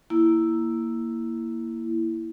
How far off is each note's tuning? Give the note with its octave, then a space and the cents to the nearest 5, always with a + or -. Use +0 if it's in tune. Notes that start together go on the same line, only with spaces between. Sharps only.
A#3 +0 E4 +0